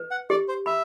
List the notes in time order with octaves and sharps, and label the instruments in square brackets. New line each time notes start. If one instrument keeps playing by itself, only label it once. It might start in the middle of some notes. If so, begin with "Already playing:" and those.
Already playing: [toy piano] B4
[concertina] F#5
[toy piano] G4 [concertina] D5
[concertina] C5
[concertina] E5 [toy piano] B5